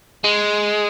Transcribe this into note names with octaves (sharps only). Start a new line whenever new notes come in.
G#3